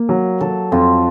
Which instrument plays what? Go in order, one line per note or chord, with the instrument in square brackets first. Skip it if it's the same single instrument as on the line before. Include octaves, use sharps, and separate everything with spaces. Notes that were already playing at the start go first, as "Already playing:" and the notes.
Already playing: [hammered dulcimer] A#3
[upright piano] F#3
[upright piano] F#3 [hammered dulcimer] A4
[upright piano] F2 [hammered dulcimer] F4